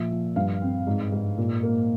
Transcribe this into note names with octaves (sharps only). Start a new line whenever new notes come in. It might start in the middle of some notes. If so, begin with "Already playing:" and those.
Already playing: A#2 F3 E5
F3
G2 F5
C4
G#2
G#2
A#2
A#3